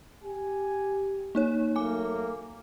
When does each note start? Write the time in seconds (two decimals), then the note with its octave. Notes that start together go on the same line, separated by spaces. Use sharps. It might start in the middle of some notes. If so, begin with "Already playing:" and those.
0.23 G4 G#5
1.35 A#3 D#4 C#5
1.76 F#3 A3 A#3 G#5 D6